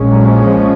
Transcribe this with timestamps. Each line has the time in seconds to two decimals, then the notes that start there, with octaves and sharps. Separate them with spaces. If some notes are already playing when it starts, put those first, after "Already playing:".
Already playing: A#1 A#2 G#3 C#4
0.09 F#3
0.27 F3
0.46 F3